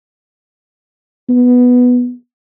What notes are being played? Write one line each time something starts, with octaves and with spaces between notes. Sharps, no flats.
B3